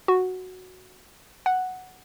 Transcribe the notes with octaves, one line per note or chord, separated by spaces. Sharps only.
F#4
F#5